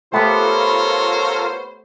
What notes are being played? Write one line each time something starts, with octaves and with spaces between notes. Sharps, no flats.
A3 B3 F4 G4 A4 A#4 C5 C#5